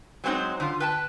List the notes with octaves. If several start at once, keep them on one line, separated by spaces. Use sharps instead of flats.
F#3 G#3 C4 C#4 D#4
D3 F4
B4 G5 A5